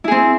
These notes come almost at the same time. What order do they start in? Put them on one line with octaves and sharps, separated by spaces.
E4 G#4 C4